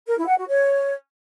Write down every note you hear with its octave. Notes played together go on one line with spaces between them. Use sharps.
A#4
E4
F#5
F#4
C#5